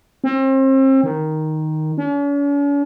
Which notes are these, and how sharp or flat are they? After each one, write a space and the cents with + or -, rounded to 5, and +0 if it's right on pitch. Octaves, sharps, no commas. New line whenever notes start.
C4 +35
D#3 +0
C#4 +45